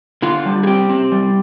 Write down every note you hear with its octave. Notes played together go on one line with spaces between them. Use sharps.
D3 F4
G3
G#4
C4 G4
C4
G3